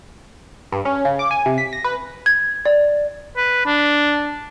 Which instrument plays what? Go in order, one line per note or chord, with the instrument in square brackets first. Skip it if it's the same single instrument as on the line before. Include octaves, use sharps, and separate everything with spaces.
[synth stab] G2
C#4
C#3
D6
G#5
C3
B6
A#6
B4
[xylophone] G#6
D5
[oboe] B4
D4